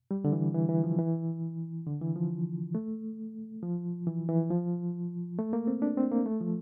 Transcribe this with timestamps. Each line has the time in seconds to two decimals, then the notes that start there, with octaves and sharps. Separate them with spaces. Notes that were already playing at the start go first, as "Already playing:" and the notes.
0.11 G3
0.25 D3
0.33 E3
0.55 E3
0.69 E3
0.84 F3
0.98 E3
1.86 D3
2.01 E3
2.16 F3
2.75 A3
3.62 F3
4.07 E3
4.29 E3
4.50 F3
5.39 A3
5.53 A#3
5.68 C4
5.82 D4
5.97 C4
6.11 A#3
6.26 A3
6.41 F3